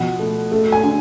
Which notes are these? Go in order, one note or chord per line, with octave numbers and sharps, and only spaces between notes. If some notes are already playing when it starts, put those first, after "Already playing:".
Already playing: B2 F3 F#5
A3
A3
G#5
D3